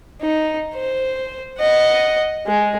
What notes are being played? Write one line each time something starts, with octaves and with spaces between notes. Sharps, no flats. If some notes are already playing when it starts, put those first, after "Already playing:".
D#4
C5
D#5 F#5
G#3